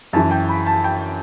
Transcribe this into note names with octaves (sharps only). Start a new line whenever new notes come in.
F#2 E3 A5
G5
B5
A5
G5